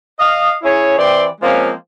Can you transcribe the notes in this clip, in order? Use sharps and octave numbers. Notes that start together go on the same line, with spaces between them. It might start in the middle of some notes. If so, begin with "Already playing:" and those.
D#5 F5
C#4 E4 G#4 C#5
E3 C4 G4 D5 C6
F3 G#3 A#3 C4 C#4